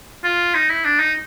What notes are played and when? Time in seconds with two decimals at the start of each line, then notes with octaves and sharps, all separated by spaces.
0.24 F4
0.54 D#4
0.69 E4
0.85 D4
0.99 D#4